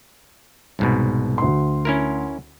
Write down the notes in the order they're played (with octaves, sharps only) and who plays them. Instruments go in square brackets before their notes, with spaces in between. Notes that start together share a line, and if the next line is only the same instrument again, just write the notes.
[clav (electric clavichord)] C2 G#2 B2
[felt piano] D2 C6
[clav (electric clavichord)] C#4 E4 A#4